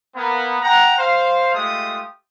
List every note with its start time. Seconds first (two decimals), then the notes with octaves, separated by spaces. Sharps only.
0.16 A#3 B3
0.62 F#5 G5 A#5
0.97 C5 F5
1.55 G#3 A3 F4 G4 D#6